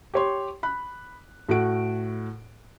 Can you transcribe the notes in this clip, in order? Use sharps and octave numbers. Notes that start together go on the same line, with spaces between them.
G4 C#5 C6
B5 F#6
A2 F#4 A4 F#5 D7